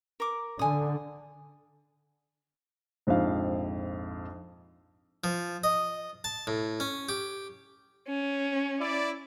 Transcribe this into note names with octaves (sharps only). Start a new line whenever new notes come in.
A#4 D6
D3 G#5 D#6
A#1 F2 G#2 F5
F3
D#5
A5
A2
C#4
G4
C#4
E4 D5